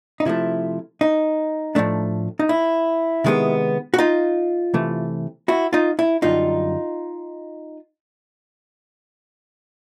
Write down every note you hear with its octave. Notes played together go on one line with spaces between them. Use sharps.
D#4
C3 F3 A3 E4
D#4
A2 F3 A3 D4
D#4
E4
C3 D#3 G#3 B3
F#4
D#4 F4
C3 E3 A3
E4 F#4
D#4 F4
E4
F#2 D3 G3 D#4 F4